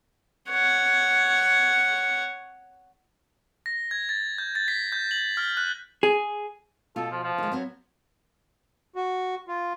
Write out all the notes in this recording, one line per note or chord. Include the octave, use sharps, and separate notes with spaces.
C#5 F#5
A#6
G#6
A6
G6
A6
B6
G6
F#7
F6
F#6
G#4
B2 F4 A4
F3
F3
D#3 G#3
F#3 B3 C4
F#4
F4